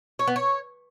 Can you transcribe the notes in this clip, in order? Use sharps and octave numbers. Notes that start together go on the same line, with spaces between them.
C#5
B3
C#5